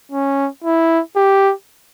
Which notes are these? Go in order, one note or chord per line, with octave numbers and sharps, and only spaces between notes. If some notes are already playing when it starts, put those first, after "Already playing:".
C#4
E4
G4